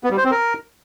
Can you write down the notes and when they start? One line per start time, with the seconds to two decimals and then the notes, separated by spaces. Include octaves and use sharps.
0.04 B3
0.11 G3
0.18 C5
0.24 C4
0.31 A#4